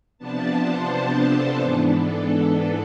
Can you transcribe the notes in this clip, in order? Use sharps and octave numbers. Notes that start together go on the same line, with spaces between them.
C3 F3 B3 D4 A5
C5
C5
A4
G#2 E3 B3 D4 G#4
A4